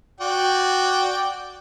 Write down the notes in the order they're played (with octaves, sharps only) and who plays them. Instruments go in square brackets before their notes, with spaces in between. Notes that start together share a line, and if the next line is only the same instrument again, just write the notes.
[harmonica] F#4 D5 G5